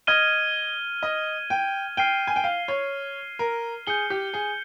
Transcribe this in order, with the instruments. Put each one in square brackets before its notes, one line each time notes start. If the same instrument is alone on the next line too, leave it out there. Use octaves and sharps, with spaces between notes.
[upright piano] D#5 [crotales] F6 G#6 D#7 G7
[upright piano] D#5
G5
[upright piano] G5 [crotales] F6 C7 D#7 G7
[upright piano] G#5
G5
F5
C#5
A#4
[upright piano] G#4 [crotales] G6 C#7 G7
[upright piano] G4
G#4